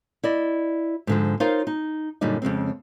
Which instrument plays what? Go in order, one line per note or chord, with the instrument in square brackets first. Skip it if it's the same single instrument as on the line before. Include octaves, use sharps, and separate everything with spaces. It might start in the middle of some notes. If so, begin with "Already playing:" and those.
[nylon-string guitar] E4 D5 D#5
G#2 D3 F3
D#4 F4 A#4 C5 C#5 F5
D#4
F#2 A#2 D3 G3 D#4
F2 C#3 G#3 C4